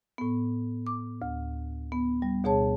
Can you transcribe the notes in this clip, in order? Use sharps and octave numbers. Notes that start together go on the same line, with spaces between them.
A2 B3
D6
D2
B3
G3
D2 B2 G#4 C#5 A5